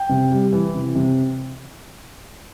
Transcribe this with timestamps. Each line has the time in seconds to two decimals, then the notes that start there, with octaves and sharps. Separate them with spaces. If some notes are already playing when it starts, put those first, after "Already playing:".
Already playing: G5
0.09 C3
0.31 G3
0.53 E3
0.74 C3
0.95 C3